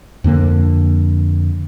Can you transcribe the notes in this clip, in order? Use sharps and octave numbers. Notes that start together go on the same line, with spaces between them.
F2 D3 A#3